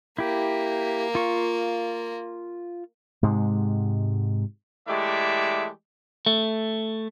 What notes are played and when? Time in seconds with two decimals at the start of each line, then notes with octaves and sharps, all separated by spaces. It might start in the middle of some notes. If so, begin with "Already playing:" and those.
0.18 A#3 E4 G4
1.15 F4 C#6
3.23 G#2 C3 G#3
4.88 E3 G#3 A3 G4 D5 E5
6.26 A3